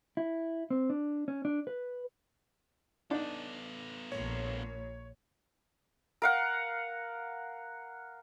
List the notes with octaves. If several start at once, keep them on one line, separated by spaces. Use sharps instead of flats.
E4
C4
D4
C#4
D4
B4
B3 D4 D#4 A4
A#1 A#2 C#5
A#4 F5 F#5